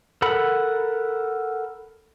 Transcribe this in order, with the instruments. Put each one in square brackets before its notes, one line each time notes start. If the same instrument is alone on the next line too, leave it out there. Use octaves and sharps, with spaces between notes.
[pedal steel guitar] A4 A#4 F#5 B5